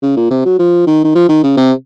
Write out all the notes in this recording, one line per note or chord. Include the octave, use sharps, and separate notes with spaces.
C#3
A#2
C3
F#3
F3
D#3
D#3
F3
D#3
C#3
C3